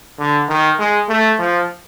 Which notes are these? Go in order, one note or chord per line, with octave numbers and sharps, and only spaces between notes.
D3
D#3
G#3
A3
F3